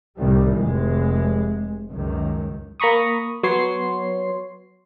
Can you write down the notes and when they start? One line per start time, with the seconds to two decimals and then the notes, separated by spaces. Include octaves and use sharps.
0.18 C2 A2 D#3 G3
0.57 F1 G#3
1.90 C#2 F#2 D#3
2.80 A#3 A#5 B5 C#6 D#6
3.43 F#3 B3 C#5 C6 C7